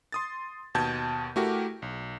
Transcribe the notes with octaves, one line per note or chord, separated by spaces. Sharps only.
C6 D#6 A6
D#2 B2 A5 G6 G#6
A3 E4 F#4 G4 A#4
B1